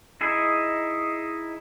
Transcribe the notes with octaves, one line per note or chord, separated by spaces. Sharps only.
D#4 E4 G#4